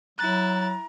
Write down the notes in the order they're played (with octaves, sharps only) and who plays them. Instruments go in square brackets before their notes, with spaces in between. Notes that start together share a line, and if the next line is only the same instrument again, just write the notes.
[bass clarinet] F#3 [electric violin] E4 A6 [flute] A#5 [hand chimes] F#6